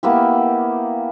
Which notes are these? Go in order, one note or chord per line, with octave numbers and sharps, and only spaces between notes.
A#3 B3 E4 G4